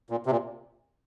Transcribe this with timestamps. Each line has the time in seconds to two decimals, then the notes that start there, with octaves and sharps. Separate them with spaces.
0.10 A#2
0.26 C3
0.31 A#2